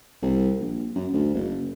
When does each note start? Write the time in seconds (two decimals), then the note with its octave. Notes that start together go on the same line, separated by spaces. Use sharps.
0.22 C2
0.60 A#1
0.95 F#2
1.13 D2
1.34 F#1